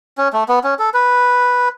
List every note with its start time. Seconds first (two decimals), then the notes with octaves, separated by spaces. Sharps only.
0.18 C#4
0.33 A3
0.48 B3
0.64 C#4
0.79 A4
0.94 B4